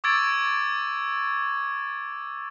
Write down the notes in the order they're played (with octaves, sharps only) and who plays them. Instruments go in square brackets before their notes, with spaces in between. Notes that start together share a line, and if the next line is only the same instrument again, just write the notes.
[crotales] C#6 D6 E6 G#6 A6 D7